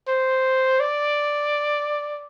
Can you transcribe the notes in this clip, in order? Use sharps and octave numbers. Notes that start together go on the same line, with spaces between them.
C5
D5